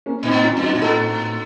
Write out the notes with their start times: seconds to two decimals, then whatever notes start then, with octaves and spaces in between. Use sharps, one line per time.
0.06 A#3 C#4
0.23 A#2 C4 D#4
0.31 A2
0.44 C#4 F4
0.57 F#2
0.62 D#4 F#4
0.75 A#2
0.81 A2 F4 A4